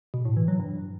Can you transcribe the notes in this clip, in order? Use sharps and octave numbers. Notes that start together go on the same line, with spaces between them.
B2
A2
E3
F#3
G2